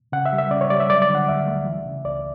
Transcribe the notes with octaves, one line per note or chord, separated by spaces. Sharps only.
C#3 F#5
E5
G3
E5
C#3 D5
C#5
G3 D5
E5
F#3 D5
D5
D3
F#5
D2 E5
A3
E3
C#3
C#2 D5